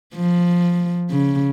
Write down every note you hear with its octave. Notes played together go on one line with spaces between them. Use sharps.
F3
C#3